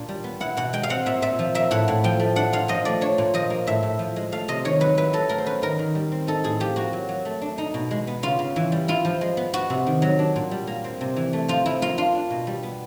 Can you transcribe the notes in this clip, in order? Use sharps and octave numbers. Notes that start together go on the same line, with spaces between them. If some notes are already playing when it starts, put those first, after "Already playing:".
Already playing: A#2 D4
G3
B3
E4 F#5
B2 F#5
G#3 G5
F5
C4 F#5
A#2 E5
A#2 E5
F3
A#3 E5
A2 F#5
A2
F3 G5
A3
D4 F#5
A#2 F5
F3 D#5
A3 D5
D4 C#5
A#2
F3 D#5
A#3
A2 E5
A2
F3
G#3
A3 F5
C3 D#5
D#3 C#5
F#3 B4
E4 B4
F#3 A4
A3 A#4
C5
C#4 B4
D#3 A#4
D#3
G3
C4
D#4 A4
A2 G#4
F3 G4
A#3 F#4
F#3
F#3
A3
D4
D#4
B2
G#3
B3
C#3 F4
C#3
E3
G3
E4 F4
F3
G#3
B3
B3 F#4
C3
D#3
F#3
D4
A#2
G3
A#3
C4
C3
E3
A3
F3 F4
F3 E4
A#3 F4
D4 F4
D4
B2
G3
B3